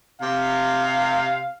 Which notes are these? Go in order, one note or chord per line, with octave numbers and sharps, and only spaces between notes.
C3 F5